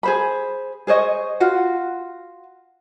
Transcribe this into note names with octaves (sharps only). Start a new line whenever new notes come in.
G#4 C5 B5
G#4 C5 C#5 D#5
F4 F#4 F#5